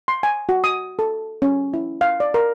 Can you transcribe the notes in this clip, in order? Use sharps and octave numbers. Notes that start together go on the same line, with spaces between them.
C6
G#5
F#4
D#6
A4
C#4
E4
F5
D5
A#4